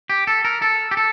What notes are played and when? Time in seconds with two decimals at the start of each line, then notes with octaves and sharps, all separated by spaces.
0.10 G4
0.27 A4
0.45 A#4
0.62 A4
0.91 G4
0.97 A4